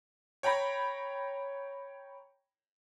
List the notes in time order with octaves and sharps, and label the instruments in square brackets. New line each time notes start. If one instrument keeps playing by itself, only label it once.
[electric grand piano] C#5 G5 A#5 B5